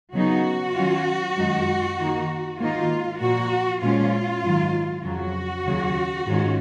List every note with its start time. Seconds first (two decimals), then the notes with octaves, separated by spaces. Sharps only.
0.14 C#3 F#3 B3 D#4 F#4
0.75 D#3 F#3 C#4 F4
1.36 F#2 D#3 G#3 D#4
1.98 D#3 A#3 D#4
2.59 G#2 D#3 A#3 D#4 F4
3.20 A#2 F3 A#3 F#4
3.81 A#2 F3 G#3 C#4 F4
4.43 G#2 D#3 F#3
5.03 F2 C#3 F#3 F#4
5.65 D#2 C#3 F#3
6.27 G#2 D#3 G#3 C#4 F4